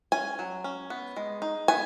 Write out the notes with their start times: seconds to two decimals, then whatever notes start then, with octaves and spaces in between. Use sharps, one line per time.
0.12 C#4 G#5
0.39 F#3
0.64 C#4
0.90 B3
1.17 G#3
1.42 D#4
1.68 B3 G#5